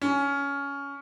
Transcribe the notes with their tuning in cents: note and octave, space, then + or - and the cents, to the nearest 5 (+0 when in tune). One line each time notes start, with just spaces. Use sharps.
C#4 +15